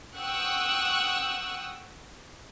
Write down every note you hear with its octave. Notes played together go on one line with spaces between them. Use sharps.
F#5 G5 C#6 D#6 E6 F#6